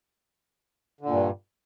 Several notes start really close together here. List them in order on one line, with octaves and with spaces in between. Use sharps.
D3 A#2 G2